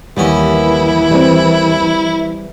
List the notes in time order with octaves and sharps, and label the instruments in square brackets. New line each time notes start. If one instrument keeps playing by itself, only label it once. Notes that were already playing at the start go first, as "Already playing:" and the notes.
[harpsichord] D#2 B3 C#4 [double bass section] E3 [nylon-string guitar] G3 [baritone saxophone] E4
[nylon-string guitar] G3 C4